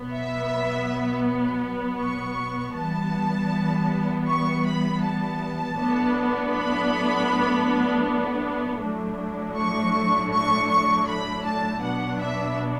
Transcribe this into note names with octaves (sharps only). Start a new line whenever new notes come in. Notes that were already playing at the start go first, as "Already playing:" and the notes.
Already playing: B2 F#3 B3
E5
C#6
E3 G3 B3 A5
C#6
B5
A5
A2 F#3 B3 D4
B5
A2 F#3 A3 D4
C#6
C#6
C#6
B5
A5
B2 F#3 B3 D4 F#5
E5